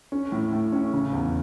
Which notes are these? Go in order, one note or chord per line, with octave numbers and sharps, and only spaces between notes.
C#4
A2
A2
C#4
C#3
E2